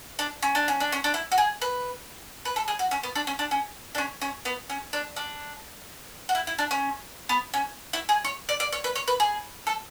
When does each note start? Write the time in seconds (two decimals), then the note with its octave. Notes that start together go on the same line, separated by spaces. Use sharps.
0.19 D4
0.42 C#4
0.55 D4
0.68 C#4
0.80 D4
0.92 C#4
1.04 D4
1.14 E4
1.32 F#4
1.38 G#4
1.61 B4
2.45 B4
2.56 A4
2.68 G#4
2.79 F#4
2.91 C#4
3.03 B3
3.15 D4
3.27 C#4
3.39 D4
3.51 C#4
3.95 D4
3.98 C#4
4.22 C#4
4.45 B3
4.70 C#4
4.93 D4
5.16 D4
6.29 F#4
6.35 E4
6.47 E4
6.59 D4
6.71 C#4
7.29 B3
7.54 C#4
7.93 E4
8.09 G#4
8.25 C#5
8.49 D5
8.60 D5
8.72 C#5
8.84 B4
8.95 C#5
9.08 B4
9.20 G#4
9.67 A4